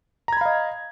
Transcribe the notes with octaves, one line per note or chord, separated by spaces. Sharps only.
D#5 F5 A#5 B5 G#6